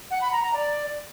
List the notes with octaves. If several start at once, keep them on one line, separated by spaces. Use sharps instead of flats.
F#5
B5
A#5
A#5
D5